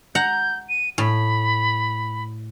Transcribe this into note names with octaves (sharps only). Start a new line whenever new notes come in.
F#5 A#5 G6
D#7
A2 B5